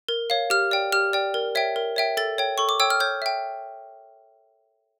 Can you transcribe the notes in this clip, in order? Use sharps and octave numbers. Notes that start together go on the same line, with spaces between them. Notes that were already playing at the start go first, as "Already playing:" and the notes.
A#4
C#5 F5
G4 F6
D5 G5
G4 F6
D5 G5
A#4
C#5 E5 G5
A#4
C#5 E5 G5
A4 A6
C#5 G5
A4 C#6
D6
C#5 G5 E6
F6
C#5 G6
E5 G5